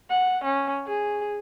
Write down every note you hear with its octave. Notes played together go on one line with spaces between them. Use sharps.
F#5
C#4
G#4